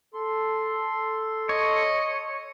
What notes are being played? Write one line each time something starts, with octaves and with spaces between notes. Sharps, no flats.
A4 C6
C#5 D#5